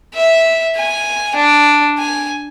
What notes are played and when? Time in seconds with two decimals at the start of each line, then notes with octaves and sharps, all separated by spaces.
0.14 E5
0.76 G#5
1.35 D4
1.99 G#5